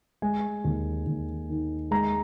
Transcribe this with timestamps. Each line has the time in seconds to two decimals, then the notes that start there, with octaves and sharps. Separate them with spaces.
0.22 G#3 G#5
0.64 D#2
1.06 D#2
1.50 D#3
1.91 G#3 A#5